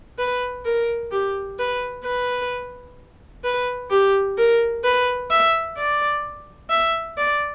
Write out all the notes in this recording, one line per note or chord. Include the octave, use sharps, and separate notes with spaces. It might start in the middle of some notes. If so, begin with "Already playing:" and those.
B4
A#4
G4
B4
B4
B4
G4
A#4
B4
E5
D5
E5
D5